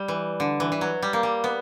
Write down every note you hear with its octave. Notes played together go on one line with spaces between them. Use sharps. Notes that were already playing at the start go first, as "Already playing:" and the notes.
Already playing: G3
E3
D3
E3
E3
F#3
G3
A#3
G3
B3